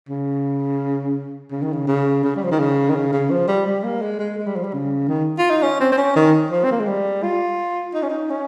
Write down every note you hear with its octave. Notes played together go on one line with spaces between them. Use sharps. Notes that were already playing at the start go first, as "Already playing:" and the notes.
C#3
C#3
D#3
C#3
C#3
C#3
G3
F3
D#3
C#3
D#3
C#3
C#3
F3
G3
G3
A#3
G#3
G#3
G#3
G3
F3
G3
C#3
D#3
F4
D#4
C#4
C4
C4
C#4
D#3
F3
C4
A#3
G#3
G3
F4
D#4
C#4
D#4
C#4